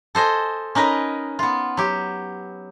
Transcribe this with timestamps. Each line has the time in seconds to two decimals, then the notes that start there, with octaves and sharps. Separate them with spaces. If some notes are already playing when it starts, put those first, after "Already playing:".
0.15 A4 C5 D#5 G#5
0.75 C#4 D#4 A#4 B4 D#5
1.39 B3 F4
1.77 F#3 G4